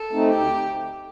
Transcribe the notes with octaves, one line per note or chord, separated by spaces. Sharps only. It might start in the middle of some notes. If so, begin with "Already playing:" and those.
Already playing: A4
A3 C4 D#4
D2 G4